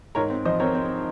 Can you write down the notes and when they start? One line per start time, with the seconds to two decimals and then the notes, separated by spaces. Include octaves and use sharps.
0.15 G#2 A#4 C#5
0.30 C4
0.45 F3 C5 D#5
0.60 C4 A#4 C#5
0.75 C4